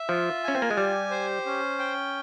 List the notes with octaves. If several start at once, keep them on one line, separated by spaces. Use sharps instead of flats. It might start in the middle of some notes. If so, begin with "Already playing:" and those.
Already playing: E5
F3 F4
C#4 G#5
C4
A#3
G#3
G3 G4
C5
C#4
G5